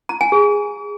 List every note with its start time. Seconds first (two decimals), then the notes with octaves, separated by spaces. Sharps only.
0.09 A#5
0.21 G#5
0.32 G#4